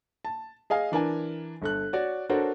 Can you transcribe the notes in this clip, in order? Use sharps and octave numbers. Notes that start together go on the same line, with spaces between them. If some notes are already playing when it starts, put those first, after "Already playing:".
A5
G#4 D#5 F5 G#5
E3 D4 A#4 G#5
G1 A4 F#6
F#4 C#5 D5
D4 F#4 A4 A#4 C5 C#5